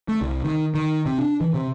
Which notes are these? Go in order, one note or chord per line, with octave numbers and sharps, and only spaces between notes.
A3
C2
D#3
D#3
C3
D4
E3
C3